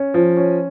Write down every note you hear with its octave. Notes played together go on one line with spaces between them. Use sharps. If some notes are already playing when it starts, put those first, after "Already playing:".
Already playing: C#4
F3
C#4